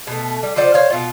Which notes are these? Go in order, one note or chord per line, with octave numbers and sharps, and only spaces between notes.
B2 A3
G3
F3 C5 D5 F#5
C5 C#5 F5
B2 F4